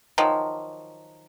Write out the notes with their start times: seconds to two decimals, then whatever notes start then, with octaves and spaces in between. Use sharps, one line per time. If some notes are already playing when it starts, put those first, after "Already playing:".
0.18 D#3 F3 F#3